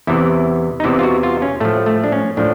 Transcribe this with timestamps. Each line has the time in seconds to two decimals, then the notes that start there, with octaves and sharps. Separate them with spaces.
0.07 E2 C3 E3 E4
0.80 D#4
0.84 E2 C3 E3 E4
0.99 F4
1.03 F#4
1.23 F4
1.42 C#4
1.60 A2 F3 A3
1.86 A3
2.04 D4
2.12 C#4
2.37 A2 F3 D4